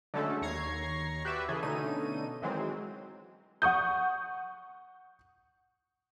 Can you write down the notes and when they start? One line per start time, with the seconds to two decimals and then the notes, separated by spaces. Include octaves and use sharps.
0.14 D3 F#3 G#3 A3 C#4 A4
0.42 D#2 C#5 A#5 G#6 C7
1.25 F#4 G4 B4 D5 E5
1.48 C#3 E3 G#4 A4
1.63 B2 D3 A3 C#4 D#4 D#7
2.42 D#3 E3 F#3 G#3 C4
3.62 F#5 C#6 D#6 G6